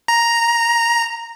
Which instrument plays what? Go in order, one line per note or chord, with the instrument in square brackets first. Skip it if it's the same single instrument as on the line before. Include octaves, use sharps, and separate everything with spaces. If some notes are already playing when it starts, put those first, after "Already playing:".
[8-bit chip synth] A#5